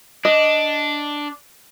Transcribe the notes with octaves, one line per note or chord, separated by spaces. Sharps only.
D4 D#5